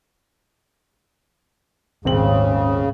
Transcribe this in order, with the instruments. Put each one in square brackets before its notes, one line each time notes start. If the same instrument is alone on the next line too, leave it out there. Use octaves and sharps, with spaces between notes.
[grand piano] D#1 C4 F#7 [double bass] G#1 [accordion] C#3